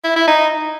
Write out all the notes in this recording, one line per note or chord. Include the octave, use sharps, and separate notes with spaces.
E4
E4
D#4